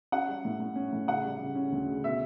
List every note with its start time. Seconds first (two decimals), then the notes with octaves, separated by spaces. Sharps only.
0.12 C#4 F#5
0.28 G3
0.45 A2
0.60 A2
0.76 C#4
0.93 A2
1.08 C#3 F#5
1.25 G3
1.40 C#3
1.55 C#4
1.72 D2
1.88 C#3
2.04 B2 E5